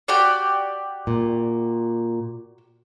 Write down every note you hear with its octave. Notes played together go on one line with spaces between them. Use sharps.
F#4 G4 D5
A#2